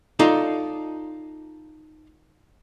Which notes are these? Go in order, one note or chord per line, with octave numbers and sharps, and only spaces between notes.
D#4 F4 A4 D5